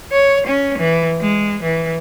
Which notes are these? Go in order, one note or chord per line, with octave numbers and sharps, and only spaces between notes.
C#5
C#4
E3
G#3
E3